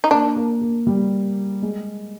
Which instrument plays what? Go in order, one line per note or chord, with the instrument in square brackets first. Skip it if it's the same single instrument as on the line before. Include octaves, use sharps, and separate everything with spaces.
[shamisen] D#4
[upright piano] A#3 [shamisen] D4
[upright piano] A#3
A#3
G3
G#3